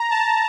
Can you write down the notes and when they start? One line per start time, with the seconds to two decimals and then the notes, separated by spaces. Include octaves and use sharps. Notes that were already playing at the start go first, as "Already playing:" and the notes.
Already playing: A#5
0.10 A5